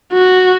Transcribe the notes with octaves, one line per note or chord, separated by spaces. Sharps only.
F#4